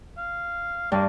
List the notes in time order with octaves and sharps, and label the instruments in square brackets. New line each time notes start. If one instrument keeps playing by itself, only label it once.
[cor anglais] F5
[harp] G2 [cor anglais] A#3